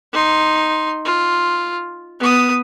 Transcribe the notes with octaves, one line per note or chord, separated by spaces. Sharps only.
D#4 C6
F4
B3 D#6